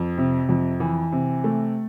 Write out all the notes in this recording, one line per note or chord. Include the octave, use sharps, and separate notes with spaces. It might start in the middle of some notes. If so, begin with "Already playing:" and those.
Already playing: F2
C3
F2
E3
C3
A3